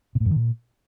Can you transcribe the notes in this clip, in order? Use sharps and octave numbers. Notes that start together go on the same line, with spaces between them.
B2
A2
F#2
D#3
A#2